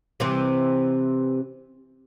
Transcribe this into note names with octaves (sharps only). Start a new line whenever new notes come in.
C3 E3 C4